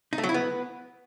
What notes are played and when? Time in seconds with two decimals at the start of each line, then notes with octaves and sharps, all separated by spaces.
0.13 D#4
0.18 A3
0.24 F#3
0.29 E4
0.34 B3